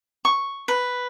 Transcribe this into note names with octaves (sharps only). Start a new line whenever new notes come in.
C#6
B4